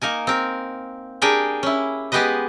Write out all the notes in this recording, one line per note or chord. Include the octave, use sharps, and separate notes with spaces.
A#3 D#4 A#4 G#5
C4 A#4
D4 G4 G#4 A#4 G5 G#5
C#4 E4
G#3 B3 G4 G#4 B4 D#5